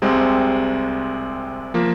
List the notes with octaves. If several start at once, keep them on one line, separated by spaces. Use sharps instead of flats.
C2 C3 G#3 C4
F3 A#3